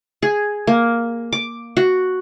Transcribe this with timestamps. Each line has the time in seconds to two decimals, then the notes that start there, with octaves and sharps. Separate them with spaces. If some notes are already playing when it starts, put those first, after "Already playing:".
0.23 G#4
0.67 A#3
1.33 D6
1.77 F#4